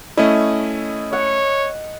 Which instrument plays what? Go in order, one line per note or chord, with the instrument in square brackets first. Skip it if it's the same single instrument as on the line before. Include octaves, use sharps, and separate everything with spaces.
[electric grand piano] A3 C#4 E4 [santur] D#5
[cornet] C#5 [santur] F#5